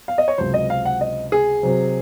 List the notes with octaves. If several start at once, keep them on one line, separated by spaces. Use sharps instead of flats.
F5
D#5
C#5
C#2 C3 F#3 C5
D#5
F5
F#5
D#5
G#4
C3 F#3 C4